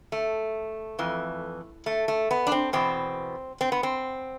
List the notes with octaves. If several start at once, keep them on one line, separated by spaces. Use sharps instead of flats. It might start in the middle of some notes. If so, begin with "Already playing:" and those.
A3
F2 E3
A3
A3
B3
D4
C4
E2 B2 C4
C4
B3
C4